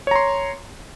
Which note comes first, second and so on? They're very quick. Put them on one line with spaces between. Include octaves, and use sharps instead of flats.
C#5 A#5 C6